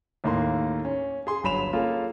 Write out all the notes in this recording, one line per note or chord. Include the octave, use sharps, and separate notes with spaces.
D#2 A2 A#3 D#4 A#5 C6
C#4
G#4 C6
G1 F#3 B5 E7 F7
A#3 C#4 F4 G#4 A4